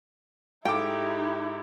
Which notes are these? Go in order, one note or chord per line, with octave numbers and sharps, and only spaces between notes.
G#2 D#4 E4 G4 A4 G5 D6